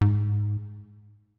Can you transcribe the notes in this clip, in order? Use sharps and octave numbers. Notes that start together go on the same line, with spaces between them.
G#2